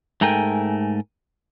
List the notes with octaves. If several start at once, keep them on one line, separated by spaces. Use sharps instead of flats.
G#2 A3 A#4 G5 G#5